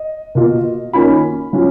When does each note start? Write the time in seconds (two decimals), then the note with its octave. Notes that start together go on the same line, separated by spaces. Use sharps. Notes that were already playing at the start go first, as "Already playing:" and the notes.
Already playing: D#5
0.35 B2 A#3 F4
0.93 D#3 A#3 C#4 F4 B5
1.53 F#3 C#4 F4